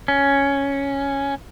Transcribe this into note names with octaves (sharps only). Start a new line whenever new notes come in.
C#4